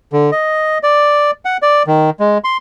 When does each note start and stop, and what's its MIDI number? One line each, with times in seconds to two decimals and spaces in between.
0.13 0.31 50
0.32 0.78 75
0.83 1.31 74
1.45 1.57 78
1.62 1.83 74
1.87 2.10 51
2.20 2.38 56
2.44 2.57 84